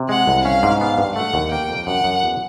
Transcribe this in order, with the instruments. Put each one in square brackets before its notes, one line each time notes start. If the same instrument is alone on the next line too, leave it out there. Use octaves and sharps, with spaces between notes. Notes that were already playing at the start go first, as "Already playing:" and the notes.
Already playing: [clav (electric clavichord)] C3
[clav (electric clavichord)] G#3 [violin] F#5
[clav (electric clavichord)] C2
[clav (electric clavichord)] C#4 [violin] F5
[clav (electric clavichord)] G#2
[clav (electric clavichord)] B3 [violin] F5
[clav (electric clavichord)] G2
[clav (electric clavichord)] A3 [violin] F#5
[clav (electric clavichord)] D#2
[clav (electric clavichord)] A#3 [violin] G5
[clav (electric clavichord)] F2
[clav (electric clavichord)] F#2 [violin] F#5
[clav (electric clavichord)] F#2
E2